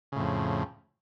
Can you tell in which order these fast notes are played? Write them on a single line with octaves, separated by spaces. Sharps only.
C#3 A2 F2